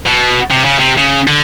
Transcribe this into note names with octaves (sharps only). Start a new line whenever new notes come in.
B2
C3
C#3
C3
C#3
D3